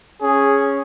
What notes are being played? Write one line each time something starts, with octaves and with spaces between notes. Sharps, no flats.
C#4 G#4